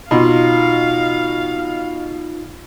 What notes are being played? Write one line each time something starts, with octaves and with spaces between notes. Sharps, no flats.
B2 D#4 F4 F5